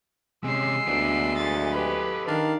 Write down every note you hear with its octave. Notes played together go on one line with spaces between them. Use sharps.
C3 G#3 C#4 E6 C7
D2 B3 D4
A4 D#5 A6
G4 B4
D#3 D4 F5